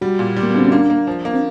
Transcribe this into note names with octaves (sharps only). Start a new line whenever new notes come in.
G3 F#4
A#2
G3
A#3
B3
D3 C4
C#4
A#3 D4
A#3
F3
A#3
C4